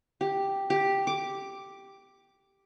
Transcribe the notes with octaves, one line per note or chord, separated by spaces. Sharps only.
G4
G4
D6